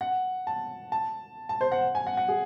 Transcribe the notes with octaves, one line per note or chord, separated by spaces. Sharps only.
F#5
A5
A5
A5
C5
F#5
G#5
F#5
F#5
G#4